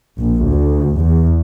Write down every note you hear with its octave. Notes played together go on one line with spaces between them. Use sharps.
A#1
D2
E2